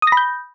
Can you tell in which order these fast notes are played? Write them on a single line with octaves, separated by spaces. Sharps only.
D#6 A#6 B5 G6